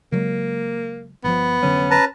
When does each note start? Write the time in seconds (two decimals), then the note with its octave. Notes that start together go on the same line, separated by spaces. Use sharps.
0.12 C#3 F#3 G#3 A#3
1.24 G1 D3 F3 B3
1.62 F1 D3 F#3 C#4
1.91 B4 A5 A#5